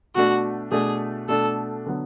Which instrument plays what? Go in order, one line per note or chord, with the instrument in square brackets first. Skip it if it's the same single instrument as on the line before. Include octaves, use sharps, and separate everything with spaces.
[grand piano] B2 A3 D4 [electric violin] F#4
[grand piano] B2 A3 D4 [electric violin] G#4
[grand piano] B2 A3 D4 [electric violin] A4
[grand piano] D3 F#3 B3